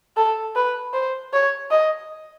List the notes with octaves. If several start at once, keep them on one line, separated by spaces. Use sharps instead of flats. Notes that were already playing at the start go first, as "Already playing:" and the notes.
A4
B4
C5
C#5
D#5